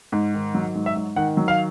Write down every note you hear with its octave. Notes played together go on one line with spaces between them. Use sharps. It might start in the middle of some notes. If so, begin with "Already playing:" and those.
G#2
D#3
F#3
G#2
E5
G#2
D#3 F#5
F#3
F5